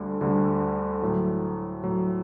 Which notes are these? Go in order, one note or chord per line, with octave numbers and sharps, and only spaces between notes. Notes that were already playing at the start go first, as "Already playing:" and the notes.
Already playing: D2 D3 G3
D2 D3 G3
A2 F#3
A2 F#3